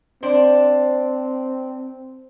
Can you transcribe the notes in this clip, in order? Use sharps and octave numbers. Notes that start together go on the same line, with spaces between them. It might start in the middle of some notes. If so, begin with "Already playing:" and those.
C4 D4 C5